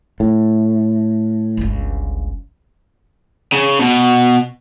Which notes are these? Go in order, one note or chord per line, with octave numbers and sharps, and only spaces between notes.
A2
G1 C#2
C#3
B2